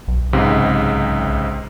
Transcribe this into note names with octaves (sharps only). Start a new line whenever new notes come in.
B1
C#2 G#2 C3